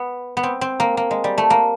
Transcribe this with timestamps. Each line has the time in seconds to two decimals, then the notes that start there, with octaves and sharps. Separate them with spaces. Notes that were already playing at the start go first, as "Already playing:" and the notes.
Already playing: B3
0.37 B3
0.43 C4
0.61 C4
0.80 A#3
0.97 A#3
1.11 G#3
1.24 G3
1.38 A3
1.50 A#3